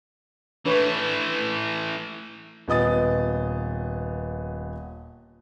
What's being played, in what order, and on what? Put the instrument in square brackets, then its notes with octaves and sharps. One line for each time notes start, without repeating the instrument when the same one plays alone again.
[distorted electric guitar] E3 A3 [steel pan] D4 B4 C#5
[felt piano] D#1 B3 D#5 D#6 A6